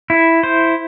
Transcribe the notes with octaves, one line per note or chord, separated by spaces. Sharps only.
E4
C5